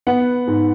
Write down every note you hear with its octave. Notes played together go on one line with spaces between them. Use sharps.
B3 F#5
G#2